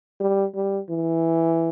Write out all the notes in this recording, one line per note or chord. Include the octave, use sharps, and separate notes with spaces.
G3
G3
E3